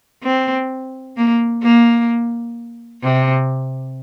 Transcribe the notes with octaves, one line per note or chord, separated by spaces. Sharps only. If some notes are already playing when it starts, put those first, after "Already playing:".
C4
A#3
A#3
C3